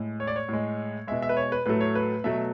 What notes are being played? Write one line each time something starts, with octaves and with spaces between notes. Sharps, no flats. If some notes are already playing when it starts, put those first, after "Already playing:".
Already playing: A2 G#3
C#5
D5
C#5
A2 G#3
B2 G#3 E5
E5
B4
C#5
B4
A2 F#3 A3 B4
C#5
B4
B2 F#3 A3 E5